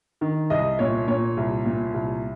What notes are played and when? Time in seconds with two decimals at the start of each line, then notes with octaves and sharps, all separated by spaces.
0.21 D#3
0.50 C2 D#5
0.79 A#2 C#5
1.07 A#2 C#5
1.37 C2
1.65 A#2
1.94 C2